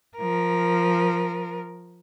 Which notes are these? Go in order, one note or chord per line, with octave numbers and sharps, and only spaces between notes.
F3 A#4